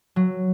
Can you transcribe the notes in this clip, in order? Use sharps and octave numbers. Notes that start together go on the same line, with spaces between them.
F#3